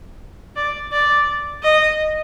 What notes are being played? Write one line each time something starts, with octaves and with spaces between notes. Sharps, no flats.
D5
D5
D#5